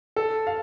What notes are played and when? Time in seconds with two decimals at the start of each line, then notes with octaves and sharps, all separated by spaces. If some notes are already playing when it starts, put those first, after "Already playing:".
0.16 A4
0.47 F5